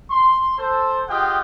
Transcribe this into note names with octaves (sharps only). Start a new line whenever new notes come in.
C6
A4 C5
F4 G4 G#4 D#5 F#5 G5